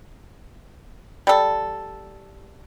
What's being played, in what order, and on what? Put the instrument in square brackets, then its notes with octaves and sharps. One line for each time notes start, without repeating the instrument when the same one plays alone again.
[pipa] G3 A4